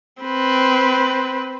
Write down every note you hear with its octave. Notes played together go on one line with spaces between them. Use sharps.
C4 B4